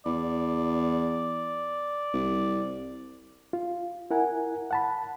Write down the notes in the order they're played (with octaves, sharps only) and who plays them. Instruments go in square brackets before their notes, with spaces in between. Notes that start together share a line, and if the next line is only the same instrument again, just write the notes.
[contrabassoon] E2 [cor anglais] D5
[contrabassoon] C2
[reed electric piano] F4
E4 A#4 F#5 G#5
F#5 A5 B5